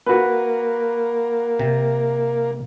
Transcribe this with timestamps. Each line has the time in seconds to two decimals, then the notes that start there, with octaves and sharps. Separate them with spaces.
0.06 A#3 F#4 B4
1.59 C3